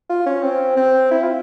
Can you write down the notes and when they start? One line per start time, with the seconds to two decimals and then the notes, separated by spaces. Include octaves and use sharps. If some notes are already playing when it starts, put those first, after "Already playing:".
0.09 F4
0.26 C#4
0.43 C4
0.76 C4
1.11 E4
1.23 F4